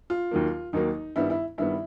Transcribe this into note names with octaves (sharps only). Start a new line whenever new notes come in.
F4
D#2 D#3 F#3 A#3
D#2 D#3 F#3 A#3 D#4
G2 D#3 G3 B3 E4
E4
G2 D#3 G3 B3 E4